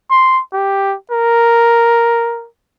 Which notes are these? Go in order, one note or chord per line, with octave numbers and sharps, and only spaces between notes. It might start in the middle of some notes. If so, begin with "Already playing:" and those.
C6
G4
A#4